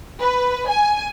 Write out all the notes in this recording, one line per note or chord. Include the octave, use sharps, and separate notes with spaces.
B4
G#5